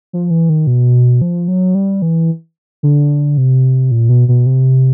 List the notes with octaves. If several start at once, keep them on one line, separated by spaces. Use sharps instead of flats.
F3
E3
D#3
B2
F3
F#3
G3
E3
D3
C3
A#2
B2
B2
C3